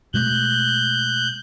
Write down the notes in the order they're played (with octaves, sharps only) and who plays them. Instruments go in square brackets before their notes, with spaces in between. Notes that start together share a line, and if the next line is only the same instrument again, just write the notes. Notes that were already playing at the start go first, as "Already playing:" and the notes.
[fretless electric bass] B2 G#3 A3 [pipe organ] F#6 G6